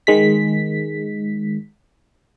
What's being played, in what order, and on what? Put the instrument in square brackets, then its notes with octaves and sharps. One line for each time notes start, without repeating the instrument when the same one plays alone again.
[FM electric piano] D#3 G#3 B6